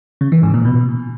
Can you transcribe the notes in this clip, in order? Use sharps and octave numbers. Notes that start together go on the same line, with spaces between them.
C#3
E3
G#2
A#2
B2